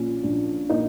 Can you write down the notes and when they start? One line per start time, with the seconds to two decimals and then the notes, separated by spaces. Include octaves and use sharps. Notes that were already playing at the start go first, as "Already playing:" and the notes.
Already playing: A#1 A#2 C#4
0.23 A#1 D4
0.70 A#2 D#4